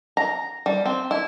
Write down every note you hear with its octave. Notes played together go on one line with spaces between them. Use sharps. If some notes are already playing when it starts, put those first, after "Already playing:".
A#5
G3
C4
E4